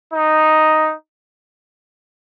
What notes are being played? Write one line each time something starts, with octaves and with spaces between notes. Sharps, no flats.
D#4